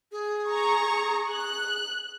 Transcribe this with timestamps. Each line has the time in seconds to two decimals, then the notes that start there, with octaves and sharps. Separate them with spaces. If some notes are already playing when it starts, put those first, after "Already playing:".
0.12 G#4
0.48 A#5 C#6
1.30 F#6